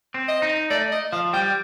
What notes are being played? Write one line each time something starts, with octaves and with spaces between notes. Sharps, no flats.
C4
D#5
D#4
A3 D5
D#5
F3 F5
G3 G5